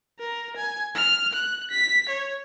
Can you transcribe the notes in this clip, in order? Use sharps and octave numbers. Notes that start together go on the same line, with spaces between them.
A#4
G#5
F6
F#6
B6
C#5